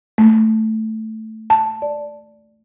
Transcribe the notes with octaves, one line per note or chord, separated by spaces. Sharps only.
A3
A5
D5